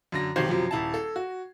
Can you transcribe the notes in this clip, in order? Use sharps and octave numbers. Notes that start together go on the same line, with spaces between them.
F#2 D3 A#6
B1 C3 D#3 C5 G#6 C7
F#2 C3 F3 F#3
D#1 E4 A5
A4
F#4